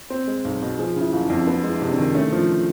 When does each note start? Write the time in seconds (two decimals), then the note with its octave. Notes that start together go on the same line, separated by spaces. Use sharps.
0.10 C4
0.28 G#3
0.45 B1
0.62 B2
0.79 F3 G#4
0.96 C#3
1.01 E4
1.12 F#1 E4
1.24 D#4
1.30 F2
1.47 B3 D4
1.63 G#3
1.70 E4
1.82 C3
1.93 D4
1.98 D#3
2.15 A3 C#4
2.32 F3